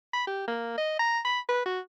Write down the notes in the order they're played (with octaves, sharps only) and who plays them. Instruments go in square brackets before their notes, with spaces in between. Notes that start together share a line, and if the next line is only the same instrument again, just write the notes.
[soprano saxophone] B5
G4
A#3
D#5
A#5
B5
B4
F#4